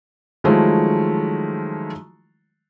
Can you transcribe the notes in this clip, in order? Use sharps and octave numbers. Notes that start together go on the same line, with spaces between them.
D#3 F3 F#3 G#3 A3 E4